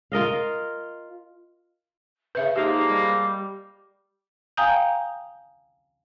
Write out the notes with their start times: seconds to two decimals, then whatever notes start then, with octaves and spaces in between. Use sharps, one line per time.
0.12 F4 A#4 D#5 F5
2.35 C#3 B4 E5
2.56 F3 G#3 A#3 D#4 G4
2.88 G3
4.57 F5 G5 G#5 A#5 D#6 G6